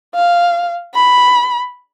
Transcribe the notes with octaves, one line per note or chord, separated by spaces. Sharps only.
F5
B5